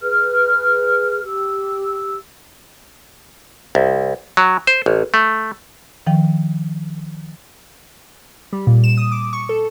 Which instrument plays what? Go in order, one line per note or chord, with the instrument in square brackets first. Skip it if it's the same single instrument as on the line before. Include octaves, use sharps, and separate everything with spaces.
[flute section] G#4 B4 F6
G4 E6
[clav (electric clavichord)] C2
F#3
C5
A1
A3
[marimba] D#3 F3 G5
[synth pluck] G3
A#2
E7
D#6
D6
C#6
A4